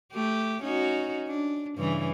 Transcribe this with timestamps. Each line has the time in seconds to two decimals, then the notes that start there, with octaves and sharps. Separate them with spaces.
0.13 A3 G4
0.63 C#4 D#4 F#4
1.27 D4
1.77 G2 C#3 E3